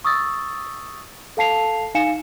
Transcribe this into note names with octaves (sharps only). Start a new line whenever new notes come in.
C#6 D#6 E6 A6
A4 F5 A5 C7 F7
D#4 F5 G#5 C#7 E7